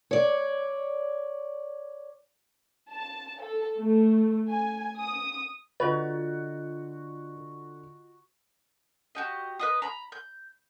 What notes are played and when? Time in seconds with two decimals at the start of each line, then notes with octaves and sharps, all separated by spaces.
0.11 C#5 D5
2.90 A5
3.41 A4
3.78 A3
4.50 G#5
4.98 D#6
5.80 D3 F4 F#4 B4 D#5 A6
9.15 F#4 G4 D#5
9.59 B4 D#5 D#6
9.82 A#5 B5
10.12 G6